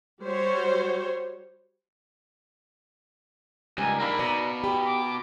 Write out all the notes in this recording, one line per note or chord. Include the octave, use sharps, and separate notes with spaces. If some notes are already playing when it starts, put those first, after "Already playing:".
G3 F#4 C5 C#5
C#2 D#3 G3 G#5
A#3 D4 A#4 E5 F5 B5
B2 D#4 D5
G4 B5
D6